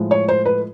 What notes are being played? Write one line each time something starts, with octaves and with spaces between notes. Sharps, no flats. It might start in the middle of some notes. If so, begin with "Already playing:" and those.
Already playing: A2 F3 G#3
C#5
C5
B4